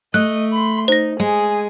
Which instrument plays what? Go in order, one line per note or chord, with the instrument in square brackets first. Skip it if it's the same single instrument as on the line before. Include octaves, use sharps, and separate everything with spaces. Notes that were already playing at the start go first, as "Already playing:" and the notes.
[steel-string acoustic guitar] A3 [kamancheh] D#5 [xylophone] F#6
[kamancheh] B5 C6
[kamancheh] D#4 [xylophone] C5 A#6
[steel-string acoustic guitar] G#3 [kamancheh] G#4 G#5